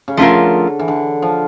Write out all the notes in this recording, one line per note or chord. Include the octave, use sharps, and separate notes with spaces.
C#3
D3 F3 A3 C#4 F4 A#4
E3
D3
F3